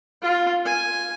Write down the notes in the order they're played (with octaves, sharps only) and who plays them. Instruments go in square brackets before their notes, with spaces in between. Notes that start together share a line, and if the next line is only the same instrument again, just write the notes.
[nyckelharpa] F4
G#5